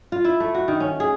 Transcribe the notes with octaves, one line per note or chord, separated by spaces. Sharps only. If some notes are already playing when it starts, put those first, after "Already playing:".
F4
E4
A3
F#4
D#3
C#4
G#4